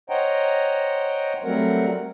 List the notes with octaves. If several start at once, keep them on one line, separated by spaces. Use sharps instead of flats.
C5 C#5 D#5 F#5 G5 A#5
F#3 G3 A3 C4 A#4 F#5